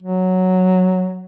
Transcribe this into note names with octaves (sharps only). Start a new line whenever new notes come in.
F#3